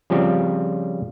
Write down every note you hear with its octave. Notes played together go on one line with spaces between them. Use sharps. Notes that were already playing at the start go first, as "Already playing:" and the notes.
C#3 F3 G3 C4 G4